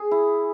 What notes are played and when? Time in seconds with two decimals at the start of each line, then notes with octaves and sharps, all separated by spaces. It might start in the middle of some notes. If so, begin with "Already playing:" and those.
Already playing: G#4
0.11 E4